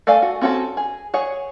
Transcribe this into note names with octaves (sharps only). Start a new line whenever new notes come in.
A3 A4 D5 F5 G#5
F#4
C4 C#4 F#4 G#4 A4
G#4
G#4 C#5 F#5